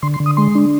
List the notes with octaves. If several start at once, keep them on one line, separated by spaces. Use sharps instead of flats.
D3 C6
C6
D3
D#6
G#3 C6
D4